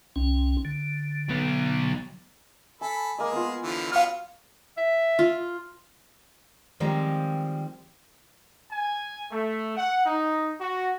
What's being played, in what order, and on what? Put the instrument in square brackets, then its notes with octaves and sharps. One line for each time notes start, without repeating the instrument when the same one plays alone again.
[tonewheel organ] C2 C#4
D3
[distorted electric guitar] F#3 B3
[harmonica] A4 B5 [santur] G#5
[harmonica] G#3 G#4 [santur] A#3 D#5
[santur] B3 F4
[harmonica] D3 E3 F3
[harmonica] F#3 B3 C#4 [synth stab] F5 F6
[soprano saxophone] E5
[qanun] F4
[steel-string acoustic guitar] D#3 F3 G3 G#3 C4
[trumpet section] G#5
A3
F#5
D#4
F#4